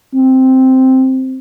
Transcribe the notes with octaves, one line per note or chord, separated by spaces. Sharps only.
C4